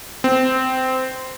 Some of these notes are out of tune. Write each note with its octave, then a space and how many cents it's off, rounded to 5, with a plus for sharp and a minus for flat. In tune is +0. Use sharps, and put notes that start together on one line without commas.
C4 -15